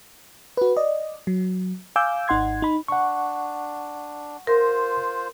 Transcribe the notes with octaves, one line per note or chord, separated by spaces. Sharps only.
F#4 B4
D5 D#5
F#3
F5 G#5 D6 E6 G6
G#1 D#4 F#5 C6 G#6
D#4 B5
D4 F#5 C#6
F4 A#4 C5